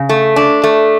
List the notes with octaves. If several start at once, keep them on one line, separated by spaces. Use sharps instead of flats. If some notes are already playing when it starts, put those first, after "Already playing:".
Already playing: C#3
A3
D4
A3